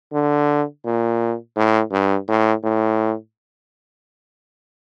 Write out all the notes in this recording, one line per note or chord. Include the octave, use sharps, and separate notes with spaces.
D3
A#2
A2
G2
A2
A2